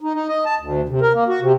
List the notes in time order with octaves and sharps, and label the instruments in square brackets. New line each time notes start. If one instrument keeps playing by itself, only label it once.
[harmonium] D#4
D#4
D#5
A5
D2
C3
A#4
A#3
F#4
C3